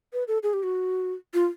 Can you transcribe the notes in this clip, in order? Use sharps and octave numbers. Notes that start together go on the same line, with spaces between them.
B4
A4
G#4
G4
F#4
F4